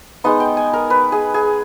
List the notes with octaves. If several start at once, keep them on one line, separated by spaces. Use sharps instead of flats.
G#3 B3 D#4 D#5
G5
G#5
A#4
B4
G#4
G#4